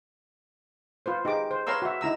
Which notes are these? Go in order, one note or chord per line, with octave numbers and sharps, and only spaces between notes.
F4 B4 C5
D#4 G4 G#4 D6
C5
B4 C#5 F5 A#5 C6 E6
F#4 E5
D#4 E4 A#5 E6